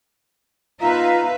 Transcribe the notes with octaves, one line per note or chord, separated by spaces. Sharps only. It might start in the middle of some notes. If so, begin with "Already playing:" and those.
B3 D#4 F4 B4 E5 F5 A#5